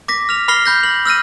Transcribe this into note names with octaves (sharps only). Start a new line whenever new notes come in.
D6 A#6 B6
F6 F7
B5 F6 A#6 C7 G7
B5 G6 A#6
F#7
E6 F6 A#6 D#7